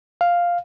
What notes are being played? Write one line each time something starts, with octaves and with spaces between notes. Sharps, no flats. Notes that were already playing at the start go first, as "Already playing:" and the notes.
F5